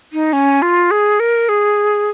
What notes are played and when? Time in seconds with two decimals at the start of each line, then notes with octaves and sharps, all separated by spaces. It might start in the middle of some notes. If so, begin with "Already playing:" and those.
0.13 D#4
0.33 C#4
0.62 F4
0.91 G#4
1.20 A#4
1.49 G#4